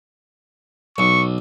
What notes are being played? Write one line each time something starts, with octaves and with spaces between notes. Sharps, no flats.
B1 C#6